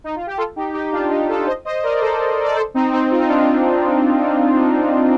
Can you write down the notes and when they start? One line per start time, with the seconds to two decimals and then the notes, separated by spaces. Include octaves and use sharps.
0.04 D#4
0.15 F4
0.27 G4
0.37 F4 A4
0.56 D#4 G4
0.74 D#4 G4
0.92 D4 F4
1.11 D#4 G4
1.28 F4 A4
1.47 C5 D#5
1.65 C5 D#5
1.83 A#4 D5
2.01 A4 C5
2.44 D5
2.56 A4 C5
2.74 C4 D#4
2.92 C4 D#4
3.11 F4
3.19 D#4
3.28 D4 F4